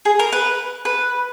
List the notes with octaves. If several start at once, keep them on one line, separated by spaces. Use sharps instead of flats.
G#4
A#4
B4
B4